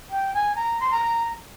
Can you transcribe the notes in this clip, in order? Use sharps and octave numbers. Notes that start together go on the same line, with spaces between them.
G5
G#5
A#5
C6
A#5